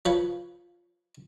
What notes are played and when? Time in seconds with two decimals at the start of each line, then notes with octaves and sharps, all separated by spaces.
0.05 F3 B4 C#5